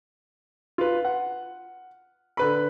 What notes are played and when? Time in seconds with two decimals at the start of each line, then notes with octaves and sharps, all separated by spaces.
0.78 F4 B4
1.05 F#5
2.37 D3 B4 B5